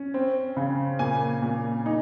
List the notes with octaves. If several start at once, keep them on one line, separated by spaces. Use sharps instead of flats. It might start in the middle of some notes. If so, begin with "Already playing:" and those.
Already playing: C#4
C4
C#3
A#2 G#5
A#2
D#4